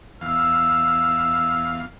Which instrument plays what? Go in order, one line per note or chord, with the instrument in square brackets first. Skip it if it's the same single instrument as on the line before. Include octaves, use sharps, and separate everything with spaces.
[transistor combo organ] E2 F5 [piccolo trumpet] E6